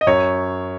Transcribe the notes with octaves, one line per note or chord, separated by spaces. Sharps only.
D#5
F#2 C#5